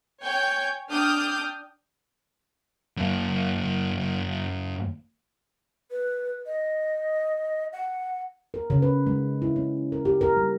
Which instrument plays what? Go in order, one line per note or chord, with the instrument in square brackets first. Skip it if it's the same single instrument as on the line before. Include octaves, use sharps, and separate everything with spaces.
[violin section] C#5 G5 G#5 G6
D4 G5 D6 D#6 F6 G6
[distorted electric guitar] F#2 A#3
[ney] B4
D#5
F#5
[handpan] A#4
C#3
B4
G#3
E4
C#4
A#4
G4
A#4
G3